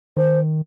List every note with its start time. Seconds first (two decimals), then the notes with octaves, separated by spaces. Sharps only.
0.17 D#3 C5